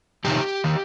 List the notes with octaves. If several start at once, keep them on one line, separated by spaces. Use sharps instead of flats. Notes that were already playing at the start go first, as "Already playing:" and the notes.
F2 C3 D#3 G4
D#3